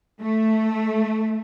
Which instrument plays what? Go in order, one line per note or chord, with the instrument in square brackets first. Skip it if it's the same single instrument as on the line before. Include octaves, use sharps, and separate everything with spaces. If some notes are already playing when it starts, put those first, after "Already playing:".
[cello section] A3